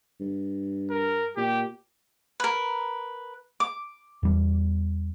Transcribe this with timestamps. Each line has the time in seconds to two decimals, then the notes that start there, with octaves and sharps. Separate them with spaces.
0.20 G2
0.91 A#4
1.37 A#2 G4
2.40 A#4 B4
3.60 D6
4.23 E2 G3